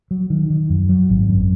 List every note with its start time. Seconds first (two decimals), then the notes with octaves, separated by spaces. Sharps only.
0.11 F#3
0.30 D#3
0.50 D#3
0.70 F#2
0.89 F#3
1.09 G#1
1.29 F#2